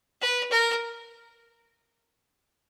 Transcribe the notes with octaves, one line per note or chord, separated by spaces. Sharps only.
B4
A#4